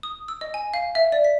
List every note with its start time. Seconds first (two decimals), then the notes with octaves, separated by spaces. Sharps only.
0.03 D#6
0.28 E6
0.41 D#5
0.54 G#5
0.74 F5
0.95 E5
1.12 D5
1.24 B6